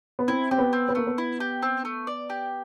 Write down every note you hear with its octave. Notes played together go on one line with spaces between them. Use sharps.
B3
C4 E4
C4 G4
B3
C4
B3
A3 A#3
B3
E4
G4
C4
A3
D5
G4